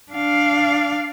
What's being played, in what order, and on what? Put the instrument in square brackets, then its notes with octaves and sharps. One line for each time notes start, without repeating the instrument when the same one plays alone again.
[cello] D4 F5